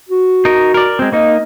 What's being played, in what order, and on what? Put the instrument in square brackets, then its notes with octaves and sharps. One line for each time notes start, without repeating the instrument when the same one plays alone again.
[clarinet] F#4
[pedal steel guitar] D#4 A#4
A#4 D5
G#3 C4
[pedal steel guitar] A#3 D#4 [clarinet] D#5